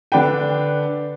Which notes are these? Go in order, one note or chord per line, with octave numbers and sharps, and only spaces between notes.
D3 D4 B4 G5